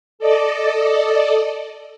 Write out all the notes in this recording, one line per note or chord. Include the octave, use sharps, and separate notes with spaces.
A4 D5 D#5